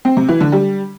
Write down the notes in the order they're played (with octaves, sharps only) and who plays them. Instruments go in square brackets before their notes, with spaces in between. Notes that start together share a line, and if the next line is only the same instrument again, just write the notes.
[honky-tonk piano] C4
C3
E3
D3
G3